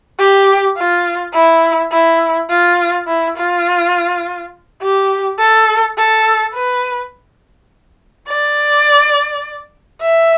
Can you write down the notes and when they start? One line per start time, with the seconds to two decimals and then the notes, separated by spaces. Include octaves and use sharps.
0.19 G4
0.78 F4
1.34 E4
1.92 E4
2.50 F4
3.07 E4
3.37 F4
4.82 G4
5.39 A4
5.97 A4
6.54 B4
8.28 D5
10.01 E5